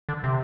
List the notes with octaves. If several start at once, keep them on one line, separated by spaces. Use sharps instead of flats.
D3
C3